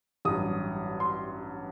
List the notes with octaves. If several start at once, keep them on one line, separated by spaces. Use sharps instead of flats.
A1 G2 F#3 D#6
C6